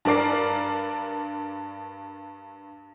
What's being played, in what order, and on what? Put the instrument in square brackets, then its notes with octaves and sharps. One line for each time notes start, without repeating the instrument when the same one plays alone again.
[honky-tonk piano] G2 D4 A#4 D5 C7